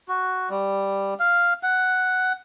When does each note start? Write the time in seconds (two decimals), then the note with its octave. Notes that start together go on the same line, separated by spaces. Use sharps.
0.08 F#4
0.50 G3
1.20 F5
1.63 F#5